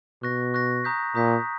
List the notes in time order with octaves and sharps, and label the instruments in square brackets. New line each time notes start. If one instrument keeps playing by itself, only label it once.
[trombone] B2 [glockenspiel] C#6 F#6 A#6
[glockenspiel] C#6 F#6 A#6
A#5 D#6 G6 B6
[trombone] A#2 [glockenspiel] A#5 D#6 G6 B6